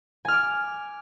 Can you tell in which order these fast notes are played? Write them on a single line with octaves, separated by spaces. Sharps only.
G#5 F6 D6